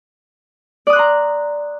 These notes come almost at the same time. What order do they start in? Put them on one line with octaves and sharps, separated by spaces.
D5 D#6 F#6 C6 A#5